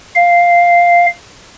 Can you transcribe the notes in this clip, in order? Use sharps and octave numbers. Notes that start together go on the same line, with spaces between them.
F5